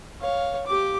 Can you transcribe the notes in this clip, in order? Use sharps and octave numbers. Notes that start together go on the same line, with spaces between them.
C#5 F5
G4 D6